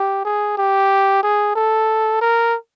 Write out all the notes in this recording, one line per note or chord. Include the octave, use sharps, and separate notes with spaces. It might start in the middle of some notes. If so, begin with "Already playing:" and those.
Already playing: G4
G#4
G4
G#4
A4
A#4